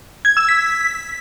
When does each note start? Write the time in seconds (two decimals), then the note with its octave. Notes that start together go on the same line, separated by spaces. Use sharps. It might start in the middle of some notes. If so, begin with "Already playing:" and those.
0.25 G#6
0.37 E6
0.49 B6